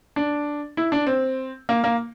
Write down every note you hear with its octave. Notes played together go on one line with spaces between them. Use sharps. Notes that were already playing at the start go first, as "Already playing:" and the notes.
D4
E4
D4
C4
A#3
A#3